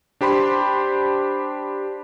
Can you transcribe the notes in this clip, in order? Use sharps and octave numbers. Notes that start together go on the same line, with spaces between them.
D4 G4 C5 B5 C6